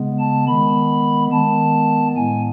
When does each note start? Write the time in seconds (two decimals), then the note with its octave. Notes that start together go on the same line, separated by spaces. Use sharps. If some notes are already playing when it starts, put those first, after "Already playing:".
Already playing: C#3 G#3 B3
0.19 A5
0.47 D#3 G#3 B3 B5
1.31 D#3 G#3 B3 A5
2.16 A2 G#3 B3 G#5